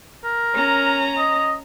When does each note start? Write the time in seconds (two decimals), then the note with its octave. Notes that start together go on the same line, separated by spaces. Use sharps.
0.24 A#4
0.54 C#4 A#5
1.18 D#5